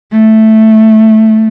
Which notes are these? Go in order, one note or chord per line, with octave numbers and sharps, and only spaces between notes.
A3